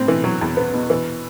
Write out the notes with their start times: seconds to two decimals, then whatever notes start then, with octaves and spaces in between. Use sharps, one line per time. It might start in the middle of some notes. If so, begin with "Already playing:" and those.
Already playing: A2 C4
0.08 E3
0.24 F#3
0.41 E2
0.57 B3
0.74 B2
0.90 E3